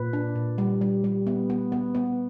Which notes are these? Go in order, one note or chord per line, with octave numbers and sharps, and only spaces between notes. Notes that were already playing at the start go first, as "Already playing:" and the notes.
Already playing: A#2 B4
D4
A#2
G3
G3
G3
B3
B3
B3
B3